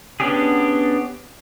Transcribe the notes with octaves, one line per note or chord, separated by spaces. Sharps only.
B3 C#4 D4 G4 G#4